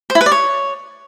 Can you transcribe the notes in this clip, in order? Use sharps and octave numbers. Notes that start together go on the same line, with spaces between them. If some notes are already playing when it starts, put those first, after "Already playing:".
C5
E4
B4
D5
C#5